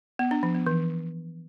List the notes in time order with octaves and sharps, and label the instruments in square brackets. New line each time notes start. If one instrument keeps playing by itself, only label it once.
[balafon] B3
D4
F3
B3
E3